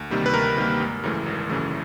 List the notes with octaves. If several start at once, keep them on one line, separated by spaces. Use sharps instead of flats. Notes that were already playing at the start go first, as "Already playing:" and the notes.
Already playing: D2
C3 D#3 G3 A#3
B4
D2 A#4
C3 D#3 G3 A#3
G#1
F#2 C#3 E3 A3
G#1
F#2 C#3 E3 A3